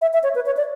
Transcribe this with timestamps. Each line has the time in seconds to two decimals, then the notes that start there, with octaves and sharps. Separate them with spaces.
0.01 E5
0.13 E5
0.23 C#5
0.35 B4
0.46 C#5
0.57 D5